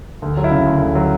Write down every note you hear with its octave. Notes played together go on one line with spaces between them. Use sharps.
D2
F#3
E4
C#3
D2
D2
F#3